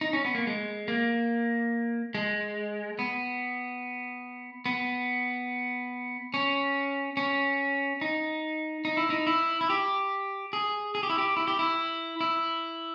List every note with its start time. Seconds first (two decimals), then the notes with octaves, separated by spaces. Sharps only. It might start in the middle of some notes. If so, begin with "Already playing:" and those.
0.01 D#4
0.13 C#4
0.25 B3
0.35 A#3
0.47 G#3
0.88 A#3
2.15 G#3
2.99 B3
4.66 B3
6.34 C#4
7.17 C#4
8.01 D#4
8.85 D#4
8.97 E4
9.10 D#4
9.27 E4
9.61 E4
9.70 G4
10.53 G#4
10.95 G#4
11.03 G4
11.10 E4
11.18 G4
11.37 E4
11.48 G4
11.59 E4
12.21 E4